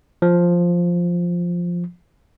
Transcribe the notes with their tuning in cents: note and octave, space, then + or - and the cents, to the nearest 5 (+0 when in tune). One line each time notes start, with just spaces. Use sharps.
F3 +0